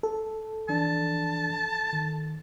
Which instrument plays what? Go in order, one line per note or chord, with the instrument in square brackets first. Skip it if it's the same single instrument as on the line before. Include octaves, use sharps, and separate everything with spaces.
[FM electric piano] A4
[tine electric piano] E3 F3 D4 [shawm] A5
[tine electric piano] D#3